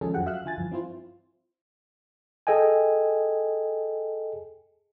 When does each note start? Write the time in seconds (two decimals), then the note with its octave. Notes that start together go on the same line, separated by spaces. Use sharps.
0.01 D#3 F3 G#3 C#4 G#4 A4
0.14 F2 F3 F#3 F#5 G5
0.25 F#3 F#4 E5 F5 E6 F#6
0.45 D3 F4 G#5 A6
0.58 G2 E3 F3
0.71 C4 E4 F4 C5
2.47 G#4 A4 D#5 G5 G#5